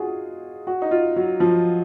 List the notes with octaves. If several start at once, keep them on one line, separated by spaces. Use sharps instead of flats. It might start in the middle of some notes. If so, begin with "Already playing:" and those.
Already playing: D#4 F4 F#4 G#4
F#4
D#4
F4
F#3
F3